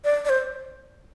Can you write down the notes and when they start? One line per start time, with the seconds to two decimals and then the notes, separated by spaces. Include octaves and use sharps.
0.04 D5
0.25 D5
0.29 C5